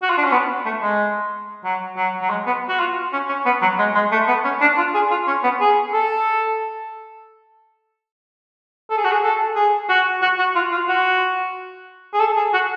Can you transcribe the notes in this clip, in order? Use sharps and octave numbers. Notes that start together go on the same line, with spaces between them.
F#4
F4
D4
C#4
B3
A3
G#3
F#3
F#3
F#3
G#3
B3
F#4
F4
C#4
C#4
B3
F#3
G#3
G#3
A3
B3
C#4
D4
F4
G#4
F4
C#4
B3
G#4
A4
A4
G#4
F#4
G#4
A4
G#4
F#4
F#4
F#4
F4
F4
F#4
G#4
A4
G#4
F#4